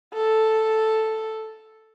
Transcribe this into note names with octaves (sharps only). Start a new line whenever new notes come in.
A4